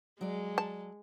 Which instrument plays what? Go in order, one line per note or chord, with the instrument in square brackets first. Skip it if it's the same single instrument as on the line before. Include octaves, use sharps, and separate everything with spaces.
[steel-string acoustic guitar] F#3 D5 [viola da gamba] G#3
[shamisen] A5